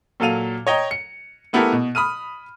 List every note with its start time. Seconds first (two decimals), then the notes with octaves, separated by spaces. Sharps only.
0.20 A#2 F#3 A4 F5 D#7 F7
0.67 C#5 D#5 G5 A#5
0.91 C#7
1.53 A3 B3 E4 G4 A4 A#4
1.72 B2
1.95 B5 D#6 F6 D#7